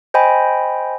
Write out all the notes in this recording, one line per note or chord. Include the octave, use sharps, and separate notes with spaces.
C5 D#5 G5 G#5 B5